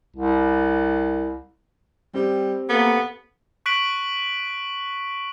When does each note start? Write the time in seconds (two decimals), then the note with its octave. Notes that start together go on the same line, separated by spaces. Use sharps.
0.16 C2
2.14 G3 C4 G4
2.70 A#3 B3 A4
3.66 C#6 F#6 B6 D7 F#7